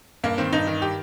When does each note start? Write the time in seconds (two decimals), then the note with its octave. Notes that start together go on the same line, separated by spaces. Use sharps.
0.24 G2 A#3
0.38 D#3 C4
0.53 G2 D#4
0.67 D#3
0.82 G4